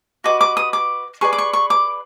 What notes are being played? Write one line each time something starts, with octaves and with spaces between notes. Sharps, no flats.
F#4 B4 D#5 D6
D6
D#6
D6
G#4 B4 D5 C#6
D6
C#6
C#6
D6